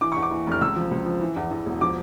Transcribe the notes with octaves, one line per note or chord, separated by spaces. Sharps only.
E3 D6
E2 C#6
D6
E3
F1 F6
C#2 E6
F3
C#2
F3
E3
E2
E2
E1
F3 D6